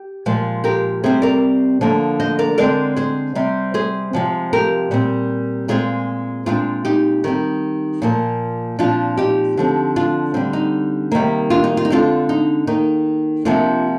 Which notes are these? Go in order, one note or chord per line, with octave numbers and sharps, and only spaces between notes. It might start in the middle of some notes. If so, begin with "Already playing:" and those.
Already playing: G4
A#2 F3 G#3
G4 A#4
C3 G3 C4 G#4 C5
A#4 D5
D3 F3 A#3
C5 D#5
A#4 D5
D3 G#3 C4 A#4 D5
G#4 C5
C3 G3 C4
G#4 C5
C3 F3 G#3
G4 A#4
A#2 G3 C4
A#2 G#3 C4 F4 G#4
A#2 G#3 C4 D4 F4
D#4 G4
D#3 G3 C4 D#4
A#2 F3 A#3
A#2 F3 C4 D4 F4
D#4 G4
D3 F3 C4
D4 F4
D3 G3 C4
D#4
C3 D#3 G3 A#3
D4 F4
D#4
F4
D#4
D3 G#3 C4 D4 F4
D#4
D#3 A#3 D#4
C3 F3 A#3 D4 F4